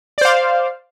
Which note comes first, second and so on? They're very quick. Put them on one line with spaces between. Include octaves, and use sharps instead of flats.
D5 C5 F5